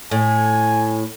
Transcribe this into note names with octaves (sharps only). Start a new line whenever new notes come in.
A2 G#5